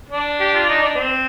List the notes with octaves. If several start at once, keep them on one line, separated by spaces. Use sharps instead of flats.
D4
G4
F4
D#4
D4
C4